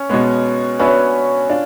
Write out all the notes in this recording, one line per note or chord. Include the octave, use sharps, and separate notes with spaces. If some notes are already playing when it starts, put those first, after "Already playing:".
Already playing: C#4
B2 G#3 B3
B3 C#4 D4 F#4 B4 E5
D4 F4